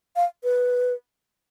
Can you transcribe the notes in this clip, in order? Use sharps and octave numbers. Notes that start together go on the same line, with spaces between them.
F5
B4